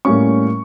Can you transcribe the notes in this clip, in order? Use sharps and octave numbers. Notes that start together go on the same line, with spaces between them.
A2 G3 A#3 C#4 C#6